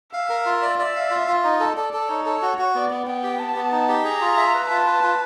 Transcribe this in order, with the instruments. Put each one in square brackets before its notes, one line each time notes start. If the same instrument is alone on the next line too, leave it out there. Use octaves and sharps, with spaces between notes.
[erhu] E5 [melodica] F5
[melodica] A#4
F4
D5
[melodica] D5 [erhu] E5
[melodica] F5
F4
F4
[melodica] D#4 [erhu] D#5
[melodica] A4
[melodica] A4 [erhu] D5
[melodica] A4
[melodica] D#4 [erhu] C#5
[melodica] A4
F#4
F#4
[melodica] B3 [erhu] D5
[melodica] B3
[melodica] B3 [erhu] G5
[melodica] G4
[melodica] B3 [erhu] A5
[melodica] B3
D#4
G4
[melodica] G#4 [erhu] A#5
[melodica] F4
E5
B4
[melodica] F4 [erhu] A5
[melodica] B4
F4